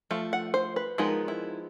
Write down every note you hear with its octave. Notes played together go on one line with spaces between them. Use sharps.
F3 A3
F#5
C5
B4
F3 G#3 B3 D#4 A#4
E4